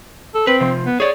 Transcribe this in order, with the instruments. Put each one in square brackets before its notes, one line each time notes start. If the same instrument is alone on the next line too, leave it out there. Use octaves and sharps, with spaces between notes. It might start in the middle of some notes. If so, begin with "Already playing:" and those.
[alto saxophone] A4
[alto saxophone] C4 [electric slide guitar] B4
[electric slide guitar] C3 F3
[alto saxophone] B3
[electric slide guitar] G#4 D5 [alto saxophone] C#5